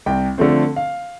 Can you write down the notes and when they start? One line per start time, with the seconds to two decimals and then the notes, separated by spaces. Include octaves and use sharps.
0.06 C2 G5
0.38 D3 F3 A3 C4
0.76 F5